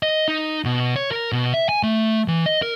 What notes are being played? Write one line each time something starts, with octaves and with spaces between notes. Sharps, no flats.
D#5
D#4
B2
C#5
A#4
B2
E5
G#5
A3
E3
D#5
A#4